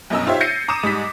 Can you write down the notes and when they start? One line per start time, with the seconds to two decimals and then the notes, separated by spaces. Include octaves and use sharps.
0.10 G1 F#2 B2 D#5 A#5 E6
0.26 D#4 F4 G4 C5 C#5 E5
0.40 G6 A6 A#6 C7 C#7 D#7
0.68 A#5 D6 D#6 D#7 E7
0.83 G#2 G3 B6